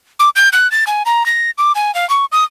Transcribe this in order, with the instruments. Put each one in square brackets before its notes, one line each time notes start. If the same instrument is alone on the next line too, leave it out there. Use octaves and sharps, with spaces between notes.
[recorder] D6
G6
F#6
A6
G#5
A#5
A#6
D6
G#5
F5
C#6
D#6